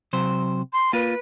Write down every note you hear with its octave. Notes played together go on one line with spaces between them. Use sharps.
C3 F#3 C5
C6
A#3 F4 B4